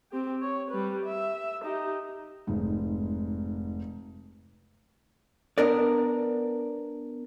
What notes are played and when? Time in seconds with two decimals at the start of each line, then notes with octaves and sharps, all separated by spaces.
0.11 C4 G4
0.42 C#5
0.71 G3 B4
1.05 E5
1.63 D#4 G4
2.47 F1 G#2
5.58 B3 D4 A#4 D5